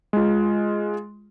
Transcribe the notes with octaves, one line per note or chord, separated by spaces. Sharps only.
G#3 F4